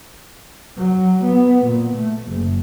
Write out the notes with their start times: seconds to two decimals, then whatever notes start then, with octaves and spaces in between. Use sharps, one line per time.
0.77 F#3
1.25 B3
1.65 A#2
1.97 A3
2.28 F#1